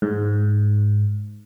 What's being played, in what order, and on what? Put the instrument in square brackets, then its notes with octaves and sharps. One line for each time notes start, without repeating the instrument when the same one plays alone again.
[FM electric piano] G#2